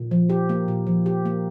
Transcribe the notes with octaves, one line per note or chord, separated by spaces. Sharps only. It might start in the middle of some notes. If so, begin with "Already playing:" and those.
Already playing: A#2
F3
G4
A#3
A#2
F3
G4
A#3